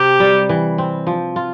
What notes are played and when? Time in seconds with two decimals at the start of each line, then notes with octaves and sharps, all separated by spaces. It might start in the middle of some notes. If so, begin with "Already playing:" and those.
Already playing: C3 G4
0.20 G3
0.49 E3
0.78 C4
1.07 F3
1.36 F4